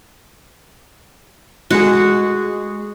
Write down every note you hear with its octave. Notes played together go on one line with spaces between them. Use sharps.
G#3 F#4 G#4